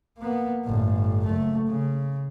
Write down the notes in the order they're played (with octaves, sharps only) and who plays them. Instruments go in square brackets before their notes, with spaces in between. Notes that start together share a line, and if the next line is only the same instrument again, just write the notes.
[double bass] A#3 B3
G1 A2
F#1 A3
C#3